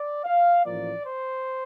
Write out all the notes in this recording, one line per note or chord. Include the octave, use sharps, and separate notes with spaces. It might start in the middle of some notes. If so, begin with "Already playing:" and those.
Already playing: D5
F5
A1 A2 F3 A#3 D5
C5